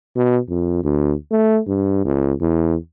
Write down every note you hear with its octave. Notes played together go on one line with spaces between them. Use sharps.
B2
F2
D2
A3
G2
C#2
E2